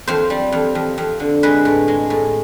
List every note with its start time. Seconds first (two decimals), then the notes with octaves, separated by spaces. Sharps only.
0.08 F2 C5
0.30 G3
0.52 F2
0.75 F2
0.98 F2
1.20 D3
1.43 G#3 B4
1.65 A2
1.88 G#3
2.10 A2